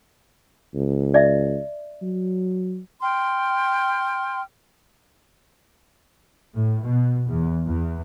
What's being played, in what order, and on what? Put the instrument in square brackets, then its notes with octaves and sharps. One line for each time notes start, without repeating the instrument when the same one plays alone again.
[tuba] C#2
[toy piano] D5 E5
[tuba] F#3
[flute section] G5 C6 F6
[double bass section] A2
B2
E2
E2